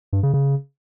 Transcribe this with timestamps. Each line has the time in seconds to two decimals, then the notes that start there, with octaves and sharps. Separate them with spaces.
0.13 G2
0.23 C#3
0.34 C#3